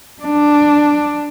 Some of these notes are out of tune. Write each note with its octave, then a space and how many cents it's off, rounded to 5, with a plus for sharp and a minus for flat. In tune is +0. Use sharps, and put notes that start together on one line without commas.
D4 +5